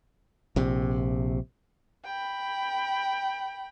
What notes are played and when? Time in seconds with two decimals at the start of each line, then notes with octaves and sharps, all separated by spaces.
0.56 A#1 C3
2.04 G5 B5